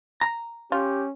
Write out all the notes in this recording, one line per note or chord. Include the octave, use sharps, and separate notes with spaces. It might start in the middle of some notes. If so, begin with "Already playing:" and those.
A#5
C#4 F4 G4